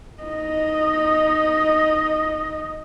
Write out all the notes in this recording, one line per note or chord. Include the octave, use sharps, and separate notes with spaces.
D#4 D#5